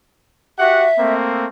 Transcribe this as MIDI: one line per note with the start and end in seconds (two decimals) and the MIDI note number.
0.59 0.87 66
0.59 0.87 67
0.59 1.14 76
0.59 0.87 78
0.99 1.46 57
0.99 1.46 58
0.99 1.46 60